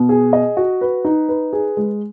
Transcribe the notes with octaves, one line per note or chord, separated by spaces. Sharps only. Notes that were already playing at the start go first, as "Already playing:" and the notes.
Already playing: B2
G#4
D#5
F#4
B4
D#4
B4
G#4
G#3